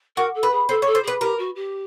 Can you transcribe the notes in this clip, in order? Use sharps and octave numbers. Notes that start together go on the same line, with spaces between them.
F#4 A#4
A4
B4
G#4
A4 C5
C#5
A4
C5
G#4 B4
G4 A#4
F#4
G4